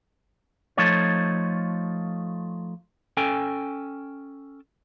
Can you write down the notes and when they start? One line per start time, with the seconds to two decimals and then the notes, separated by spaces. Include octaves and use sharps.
0.77 F3 A3 D#4 F4 C#5
3.17 C#4 A4 G5 G#5